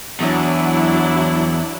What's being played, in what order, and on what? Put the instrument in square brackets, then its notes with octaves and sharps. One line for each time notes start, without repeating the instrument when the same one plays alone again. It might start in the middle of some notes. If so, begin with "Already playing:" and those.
[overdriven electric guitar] E2 [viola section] F#3 D4 E4